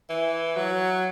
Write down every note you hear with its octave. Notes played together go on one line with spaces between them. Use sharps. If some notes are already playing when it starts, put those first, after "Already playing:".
E3
F#3